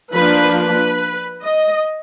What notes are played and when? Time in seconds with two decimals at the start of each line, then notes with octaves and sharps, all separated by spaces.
0.13 F3 A#3 D4 B4
0.57 B4
1.43 D#5